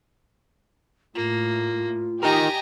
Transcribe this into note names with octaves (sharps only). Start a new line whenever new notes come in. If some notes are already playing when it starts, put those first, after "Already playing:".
A2 A#3 F4
D#4 G4 A#4 D#5 G#5 A#5